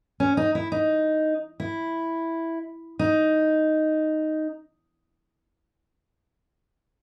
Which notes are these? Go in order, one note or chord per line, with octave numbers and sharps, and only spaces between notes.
C#4
D#4
E4
D#4
E4
D#4